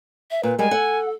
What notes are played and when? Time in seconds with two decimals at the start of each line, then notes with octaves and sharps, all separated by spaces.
0.31 E5
0.43 A#2 B4
0.59 G3 G#3 A#4 G#5
0.71 A4 F#5